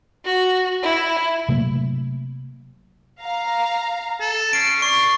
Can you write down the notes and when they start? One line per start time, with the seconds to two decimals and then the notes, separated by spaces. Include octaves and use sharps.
0.25 F#4
0.83 E4
1.49 C3 F#3 A3 A#3
3.21 F5 A#5
4.20 A4
4.53 C#4 C7 D7
4.82 D5 C#6 C7